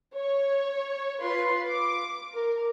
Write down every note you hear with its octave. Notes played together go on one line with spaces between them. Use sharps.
C#5
F4 B4 C6
D6
A#4